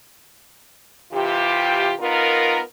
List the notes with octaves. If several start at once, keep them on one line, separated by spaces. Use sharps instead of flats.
C3 E3 F4 G4
B3 D#4 F4 A#4